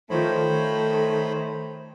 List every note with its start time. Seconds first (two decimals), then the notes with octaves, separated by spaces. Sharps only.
0.10 D#3 F3 A3 C5 C#5 B5
0.47 D#3 A3